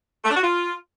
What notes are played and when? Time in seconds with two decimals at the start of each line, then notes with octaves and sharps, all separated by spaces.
0.25 A3
0.30 D4
0.36 F#4
0.42 F4